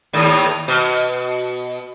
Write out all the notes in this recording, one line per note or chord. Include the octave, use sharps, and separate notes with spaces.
D#2 A2
B2